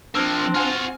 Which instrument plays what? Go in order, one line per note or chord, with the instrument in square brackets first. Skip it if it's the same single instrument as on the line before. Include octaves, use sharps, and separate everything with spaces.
[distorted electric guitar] F3 A#3 [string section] C4 [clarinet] D4 [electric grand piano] E6 F6 A#6
[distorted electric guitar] F4 F#4 [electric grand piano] G#5 C6 F6